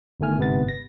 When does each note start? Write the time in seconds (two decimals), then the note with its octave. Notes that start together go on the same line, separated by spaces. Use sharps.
0.20 G1 G2 D#3 A3 G#5 F6
0.38 G1 G#2 C3 B3 B4 A6
0.68 A#6